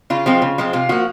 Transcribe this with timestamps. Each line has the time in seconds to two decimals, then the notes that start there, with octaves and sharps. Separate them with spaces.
0.10 C#3 F4
0.26 F3 G#3 C4
0.42 C#3
0.58 F3 G#3 C4
0.73 C3 F4
0.89 F3 A#3 F#4